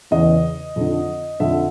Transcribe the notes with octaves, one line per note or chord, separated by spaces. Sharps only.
E2 C#3 E3 D#5
F2 D3
F2 D3 E5